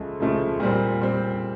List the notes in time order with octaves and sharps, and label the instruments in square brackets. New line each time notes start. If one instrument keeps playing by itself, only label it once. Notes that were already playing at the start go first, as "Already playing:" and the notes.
Already playing: [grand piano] C#2 C#3 F3 A3
C#2 C#3 F3 A3
A#2 G3 C4
A#2 G3 C4